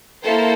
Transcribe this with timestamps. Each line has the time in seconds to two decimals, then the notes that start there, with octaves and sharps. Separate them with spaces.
0.23 A#3 E4 A4 C5